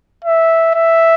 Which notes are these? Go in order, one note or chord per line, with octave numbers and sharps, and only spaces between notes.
E5
E5